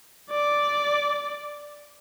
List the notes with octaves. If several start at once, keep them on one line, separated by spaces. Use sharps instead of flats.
D5